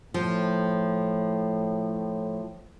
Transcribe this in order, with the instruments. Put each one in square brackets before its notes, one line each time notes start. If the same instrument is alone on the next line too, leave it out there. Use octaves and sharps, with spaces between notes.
[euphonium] A2 [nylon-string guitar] F3